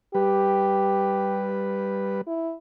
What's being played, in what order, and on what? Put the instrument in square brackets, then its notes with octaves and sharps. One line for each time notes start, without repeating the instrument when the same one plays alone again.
[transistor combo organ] G3 B4 [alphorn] G4
[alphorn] E4